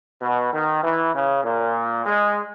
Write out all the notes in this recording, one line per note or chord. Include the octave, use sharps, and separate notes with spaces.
B2
D#3
E3
C#3
A#2
G#3